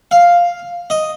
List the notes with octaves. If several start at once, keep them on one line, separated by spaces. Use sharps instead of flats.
F5
D#5